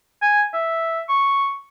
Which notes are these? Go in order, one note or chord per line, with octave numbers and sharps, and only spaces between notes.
G#5
E5
C#6